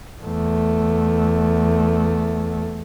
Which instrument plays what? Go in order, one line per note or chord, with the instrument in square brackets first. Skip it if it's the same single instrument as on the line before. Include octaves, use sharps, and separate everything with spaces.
[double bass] E2 A3